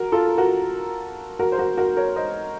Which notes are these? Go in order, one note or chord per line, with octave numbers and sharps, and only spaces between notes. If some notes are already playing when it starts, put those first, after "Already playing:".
Already playing: F#4 A#4
F4 A4
F#4 A#4
F#4 A#4
C5
F#4 A#4
F#4 A#4
A#4 C#5
C5 D#5